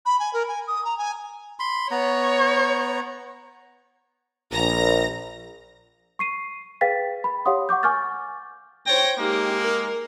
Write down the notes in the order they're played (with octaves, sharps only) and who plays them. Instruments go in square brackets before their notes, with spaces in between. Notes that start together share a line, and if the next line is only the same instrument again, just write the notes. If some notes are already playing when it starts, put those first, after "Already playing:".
[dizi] B5
G#5
A#4
G#5
D#6
A#5
G#5
[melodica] B5 C6
[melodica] B3 A#5 [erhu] C#5
[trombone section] A#1 [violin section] A#5 A#6
[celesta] C#6 C7 D#7
G#4 B4 F5 G5 A6 B6
B5
G4 C#5 F5 F#5 C6 D#6
F#5 C#6 D6 G6
G#5 C#6 D6 F6 G6 A6
[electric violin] C5 A#6 [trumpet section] C#5 G5
[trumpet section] G#3 A#3 [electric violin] D#4 G4
[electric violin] A#4